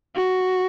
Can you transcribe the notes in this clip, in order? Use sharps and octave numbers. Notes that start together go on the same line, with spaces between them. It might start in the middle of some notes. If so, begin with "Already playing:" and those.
F#4